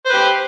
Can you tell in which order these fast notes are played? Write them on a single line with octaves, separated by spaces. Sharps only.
C5 B4 G4